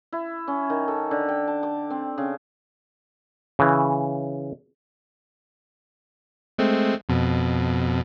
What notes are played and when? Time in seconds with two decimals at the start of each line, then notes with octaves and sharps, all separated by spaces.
0.12 E4
0.48 C#4
0.70 D#3
0.88 A4
1.11 D3
1.29 G5
1.48 A5
1.63 D6
1.90 C4
2.18 C#3
3.59 C#3 E3
6.58 G#3 A3 C4
7.09 F2 B2